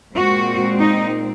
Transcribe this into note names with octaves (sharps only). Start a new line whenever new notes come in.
A#2 G#3 C4 F#4
D#4